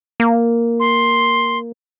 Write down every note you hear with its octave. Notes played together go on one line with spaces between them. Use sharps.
A#3
C6